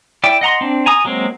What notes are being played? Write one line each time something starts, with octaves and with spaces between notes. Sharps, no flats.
E4 D5 G5
D#5 F#5 A#5 C6
C4 D4
G#5 A#5 D#6
F#3 G#3 A#3 C4